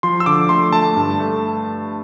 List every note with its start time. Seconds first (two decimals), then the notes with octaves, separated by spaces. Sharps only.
0.03 F3 C6
0.20 E6
0.26 D3 D6
0.49 A3 C6
0.73 A3 A5
0.96 G2
1.20 A3